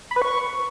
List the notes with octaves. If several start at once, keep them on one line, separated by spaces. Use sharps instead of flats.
B5
B4
C#6